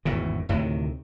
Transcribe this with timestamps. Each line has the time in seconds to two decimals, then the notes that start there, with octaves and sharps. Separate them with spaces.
0.05 G#1 E2 A2 C#3
0.49 D2 A2 C3 D#3